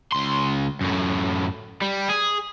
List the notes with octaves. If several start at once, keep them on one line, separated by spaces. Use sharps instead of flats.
C#2 C6
F#2 A2
G3
G#4